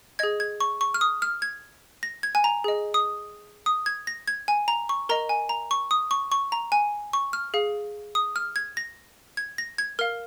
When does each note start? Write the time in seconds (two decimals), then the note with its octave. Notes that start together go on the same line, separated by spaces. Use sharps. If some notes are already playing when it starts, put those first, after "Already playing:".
0.19 G#4 D#5 G#6
0.40 G#6
0.60 C#6
0.81 C#6
0.94 F6
1.01 D#6
1.22 F6
1.42 G#6
2.03 A#6
2.23 G#6
2.35 G#5
2.44 A#5
2.64 G#4 D#5
2.94 D#6
3.66 D#6
3.86 G#6
4.07 A#6
4.28 G#6
4.48 G#5
4.68 A#5
4.89 C#6
5.09 A#4 D#5 A#5
5.29 G#5
5.49 A#5
5.71 C#6
5.91 D#6
6.11 C#6
6.32 C#6
6.52 A#5
6.72 G#5
7.13 C#6
7.33 F6
7.54 G#4 F5
8.15 D#6
8.36 F6
8.56 G#6
8.77 A#6
9.37 G#6
9.58 A#6
9.78 G#6
9.99 A#4 F5 F6